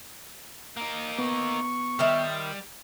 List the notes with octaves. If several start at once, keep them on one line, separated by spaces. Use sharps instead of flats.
A#3 D#4
B3 C#6
D#3 G3 C5 E5